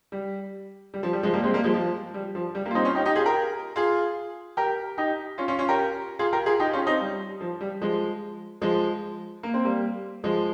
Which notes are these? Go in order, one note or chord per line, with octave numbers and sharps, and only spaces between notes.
G3
G3
F3
G3
F3 G#3
G3 A#3
G#3 C4
G3 A#3
F3 G#3
F3
G3
F3
G3
G3 A#3
F4
C4 D#4
C#4 F4
D#4 G4
D#4 G4
F4 G#4
G4 A#4
F4 G#4
G4 A#4
D#4 G4
C#4 F4
C#4 F4
C#4 F4
G4 A#4
F4 G#4
G4 A#4
F4 G#4
D#4 G4
C#4 F4
C4 D#4
G3
F3
G3
F3 G#3
F3 G#3
A#3
C4
G3 A#3
F3 G#3